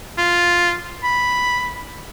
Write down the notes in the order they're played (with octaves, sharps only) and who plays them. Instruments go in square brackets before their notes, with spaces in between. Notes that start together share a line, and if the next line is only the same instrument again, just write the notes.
[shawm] F4
B5